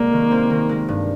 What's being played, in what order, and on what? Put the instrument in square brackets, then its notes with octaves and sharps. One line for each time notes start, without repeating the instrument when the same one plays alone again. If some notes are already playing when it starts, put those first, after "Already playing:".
Already playing: [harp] C2 G#3 [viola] A#3
[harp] D#3
C4
D#3
G#3
G2